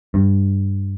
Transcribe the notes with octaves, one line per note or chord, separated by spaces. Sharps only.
G2